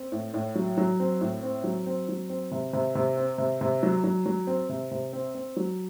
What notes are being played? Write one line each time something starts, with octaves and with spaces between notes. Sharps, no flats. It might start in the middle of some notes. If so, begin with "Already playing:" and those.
Already playing: C4
A2
A2
F#3
F#3
C4
A2
C4
F#3
C4
F#3
C4
C3
C3
C3
C4
C3
C3
F#3
F#3
F#3
C4
C3
C3
C4
C4
F#3